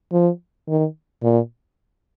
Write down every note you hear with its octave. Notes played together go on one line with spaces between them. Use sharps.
F3
D#3
A#2